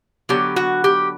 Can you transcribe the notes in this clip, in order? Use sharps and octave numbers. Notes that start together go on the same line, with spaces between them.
D3 F#3 B3 G4
F#4
G4